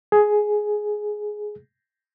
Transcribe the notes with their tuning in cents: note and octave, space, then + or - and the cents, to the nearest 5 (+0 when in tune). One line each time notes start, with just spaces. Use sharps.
G#4 +10